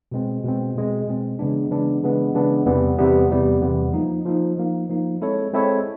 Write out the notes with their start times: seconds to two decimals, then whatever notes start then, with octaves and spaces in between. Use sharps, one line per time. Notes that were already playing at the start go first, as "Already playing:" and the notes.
0.12 B2 G#3 C4
0.44 B2 G#3 C4
0.76 B2 G#3 C4
1.07 B2 G#3 C4
1.39 C#3 E3 G#3 B3 D4
1.71 C#3 E3 G#3 B3 D4
2.03 C#3 E3 G#3 B3 D4
2.35 C#3 E3 G#3 B3 D4
2.66 E2 C3 E3 G3 B3
2.98 E2 C3 E3 G3 B3
3.30 E2 C3 E3 G3 B3
3.62 E2 C3 E3 G3 B3
3.94 F3 A#3 D#4
4.26 F3 A#3 D#4
4.57 F3 A#3 D#4
4.90 F3 A#3 D#4
5.21 G#3 C4 E4 A4 C#5
5.53 G#3 C4 E4 A4 C#5